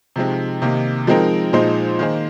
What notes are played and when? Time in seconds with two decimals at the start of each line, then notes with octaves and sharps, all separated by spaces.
0.16 C3 F3 G#3 C4 D#4
0.62 C3 D#3 A#3 D#4
1.07 F3 G#3 C4 D#4 A#4
1.53 A#2 F3 G#3 D#4 C5
1.99 D#3 A#3 G#4 C5